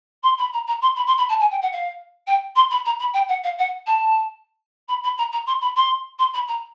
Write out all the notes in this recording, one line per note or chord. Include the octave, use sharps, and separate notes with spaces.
C6
B5
A#5
A#5
C6
B5
C6
B5
A5
G#5
G5
F#5
F5
G5
C6
B5
A#5
B5
G5
F#5
F5
F#5
A5
B5
B5
A#5
A#5
C6
B5
C6
C6
B5
A#5